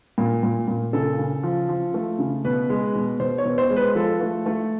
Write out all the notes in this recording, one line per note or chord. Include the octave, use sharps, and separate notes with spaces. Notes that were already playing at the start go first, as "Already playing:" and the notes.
A#2
A#2
A#2
C#3 A4
C#3
F3
F3
A3
C#3
B2 B4
G#3
B2
B2 C5
C#5
B2
C5
G#3
B4
F3 A4
A3
A3